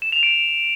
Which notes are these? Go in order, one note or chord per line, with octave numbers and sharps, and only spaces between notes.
E7
F7
D7